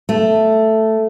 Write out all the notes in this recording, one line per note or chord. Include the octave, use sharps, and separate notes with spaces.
A3